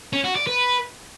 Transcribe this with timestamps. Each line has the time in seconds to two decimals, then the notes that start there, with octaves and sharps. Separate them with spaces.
0.13 C#4
0.24 F#4
0.36 D5
0.47 B4